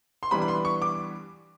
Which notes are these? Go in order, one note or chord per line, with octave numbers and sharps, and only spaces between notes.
C6
E3 G3 B3 D4 B5
B5
C6
C#6
D6